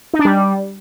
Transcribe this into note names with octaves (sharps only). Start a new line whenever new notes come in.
D#4
D4
G3